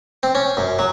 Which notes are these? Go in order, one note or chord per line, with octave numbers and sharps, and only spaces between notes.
C4
C#4
F#2
F#3